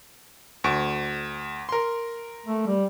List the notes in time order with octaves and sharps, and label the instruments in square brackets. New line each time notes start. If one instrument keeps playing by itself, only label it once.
[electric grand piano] D2 C#6 D7
A#4 C6
[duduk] A3
G3